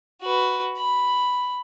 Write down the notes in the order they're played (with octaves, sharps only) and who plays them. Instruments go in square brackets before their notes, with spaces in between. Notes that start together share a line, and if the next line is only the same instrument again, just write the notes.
[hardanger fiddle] F#4 B4
B5